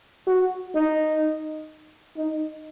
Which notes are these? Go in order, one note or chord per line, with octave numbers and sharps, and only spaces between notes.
F#4
D#4
D#4